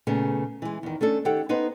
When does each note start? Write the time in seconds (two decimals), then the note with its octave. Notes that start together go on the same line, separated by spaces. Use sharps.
0.07 A#2 C#3 A3 B3
0.62 E3 G#3
0.83 E2 D#3
1.01 A3 C#4 D4 A4
1.25 D#3 G4 A4 C#5 F#5 G5
1.49 B3 D#4 B4 C5